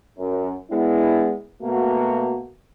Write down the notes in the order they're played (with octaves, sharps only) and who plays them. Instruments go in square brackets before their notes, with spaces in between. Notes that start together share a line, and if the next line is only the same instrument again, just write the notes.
[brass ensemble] F#2
G#3 B3 D4 E4
B2 A3 A#3 F#4